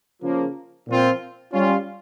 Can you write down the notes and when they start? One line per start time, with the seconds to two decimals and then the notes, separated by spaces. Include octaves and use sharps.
0.23 C#3 F3 A#3
0.88 A#2 F3 C4 F4
1.53 G3 C#4 F4